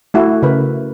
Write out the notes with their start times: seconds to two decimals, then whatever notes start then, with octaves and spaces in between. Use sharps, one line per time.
0.14 A3 E4 F#4
0.42 C#3 A#4 B4